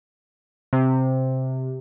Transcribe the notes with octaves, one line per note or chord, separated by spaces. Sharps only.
C3